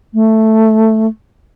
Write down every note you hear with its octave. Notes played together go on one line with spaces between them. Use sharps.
A3